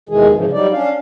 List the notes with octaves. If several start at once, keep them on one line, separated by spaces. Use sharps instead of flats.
D#2 B2 D#3 E3 G#3 G#4
G#2 C#3 E3 F3
F#3 G3 D#4 D5
C#4 D4 F5